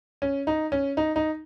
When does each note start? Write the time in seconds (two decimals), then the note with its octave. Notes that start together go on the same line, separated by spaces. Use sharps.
0.22 C#4
0.47 D#4
0.72 C#4
0.97 D#4
1.16 D#4